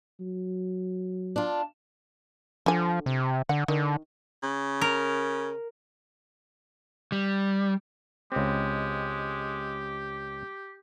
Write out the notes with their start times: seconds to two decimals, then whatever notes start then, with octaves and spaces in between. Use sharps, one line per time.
0.20 F#3
1.36 D4 F4
2.66 D3 F3 G#5
3.06 C3
3.49 D3 F#5
3.68 D3 D#3
4.43 C#3
4.81 A#4
7.12 G3
8.32 C#2 G#3 C4 G4